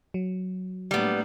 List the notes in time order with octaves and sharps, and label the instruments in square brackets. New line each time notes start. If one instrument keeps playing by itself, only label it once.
[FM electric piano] F#3
[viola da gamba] A2 A#3 D4 [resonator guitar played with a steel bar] G3 B3